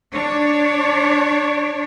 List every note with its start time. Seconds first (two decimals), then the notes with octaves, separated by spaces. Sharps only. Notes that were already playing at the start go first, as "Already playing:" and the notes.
0.12 D4 C#5